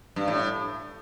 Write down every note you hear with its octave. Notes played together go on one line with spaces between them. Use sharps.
G2
A2